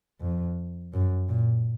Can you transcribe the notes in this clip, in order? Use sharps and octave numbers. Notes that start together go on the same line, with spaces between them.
F2
F#2
A#2